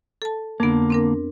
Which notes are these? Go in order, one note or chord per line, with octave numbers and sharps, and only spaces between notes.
A4 A5
F2 D3 A#3 B3
C4 D4 A#4